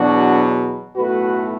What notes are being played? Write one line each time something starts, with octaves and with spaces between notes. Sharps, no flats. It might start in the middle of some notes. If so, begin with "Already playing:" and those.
Already playing: E2 B2 F#3 D4 F#4
B1 A2 A3 F#4 B4